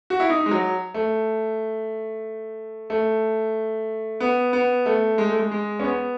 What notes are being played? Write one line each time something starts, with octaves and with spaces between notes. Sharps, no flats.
F#4
E4
D#4
G#3
F#3
A3
A3
B3
B3
A3
G#3
A3
G#3
G#3
C#4
B3